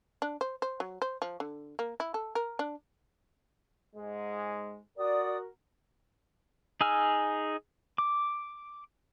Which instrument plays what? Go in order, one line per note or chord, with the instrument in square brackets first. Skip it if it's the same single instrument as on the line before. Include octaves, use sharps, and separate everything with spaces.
[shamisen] D4
C5
C5
F#3
C5
F3
D3
A#3
E4
A4
A#4
D4
[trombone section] G#2 G#3
[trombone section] F#4 A#4 [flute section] D5 D#6
[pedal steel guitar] D#4 G#4 G#5 E6 F6
D6